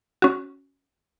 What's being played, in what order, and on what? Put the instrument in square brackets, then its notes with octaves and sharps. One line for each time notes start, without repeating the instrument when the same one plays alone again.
[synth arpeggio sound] C#4 F#4